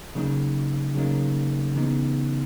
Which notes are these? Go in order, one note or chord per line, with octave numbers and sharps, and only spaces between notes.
C#3 F#3 A#3 D#4
C#3 F#3 A#3 D#4
C#3 E3 B3 D#4